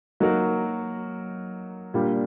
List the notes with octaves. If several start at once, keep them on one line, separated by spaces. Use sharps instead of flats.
F#3 A#3 D#4 F#4 A#4
A#2 G3 A#3 D4 G4